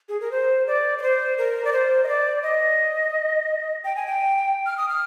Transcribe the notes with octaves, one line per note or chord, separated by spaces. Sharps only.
G#4
A#4
C5
D5
D5
C5
A#4
D5
C5
D#5
D5
D#5
G5
G#5
G5
F6
D#6
F6